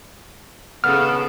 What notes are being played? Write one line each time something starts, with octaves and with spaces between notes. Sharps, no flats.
C#3 B3 D#4 A4 F6